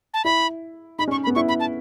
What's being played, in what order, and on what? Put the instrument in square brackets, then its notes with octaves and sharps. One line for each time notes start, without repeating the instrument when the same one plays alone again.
[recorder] A5
[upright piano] E4 [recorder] B5
[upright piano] D#4 [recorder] B5
[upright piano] C#4
[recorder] C#6
B5
[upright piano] B3
[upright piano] E4 [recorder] C#6
[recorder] B5
A5